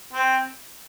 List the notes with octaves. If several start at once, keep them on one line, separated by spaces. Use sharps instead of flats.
C4